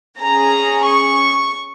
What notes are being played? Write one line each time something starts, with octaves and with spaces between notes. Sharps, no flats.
C#4 G#4 A#5
C#6